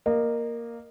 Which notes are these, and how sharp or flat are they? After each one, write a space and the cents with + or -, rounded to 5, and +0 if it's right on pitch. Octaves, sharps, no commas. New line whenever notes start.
A#3 +0 D#5 -30